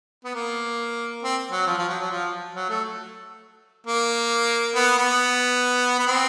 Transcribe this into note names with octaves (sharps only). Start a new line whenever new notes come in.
B3
A#3
C4
F#3
F3
F3
F#3
F#3
F3
F#3
A3
A#3
B3
B3
B3
C4